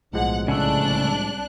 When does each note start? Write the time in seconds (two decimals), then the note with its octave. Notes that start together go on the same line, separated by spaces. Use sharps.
0.13 B1 A2 F3 G#3 F#5
0.48 C2 C#3 A3 D4 F#6